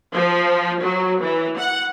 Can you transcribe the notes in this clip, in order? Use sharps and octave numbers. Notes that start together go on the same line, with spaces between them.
F3
F#3
E3
F#5